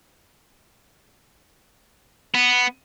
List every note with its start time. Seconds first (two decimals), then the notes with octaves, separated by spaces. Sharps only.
2.35 B3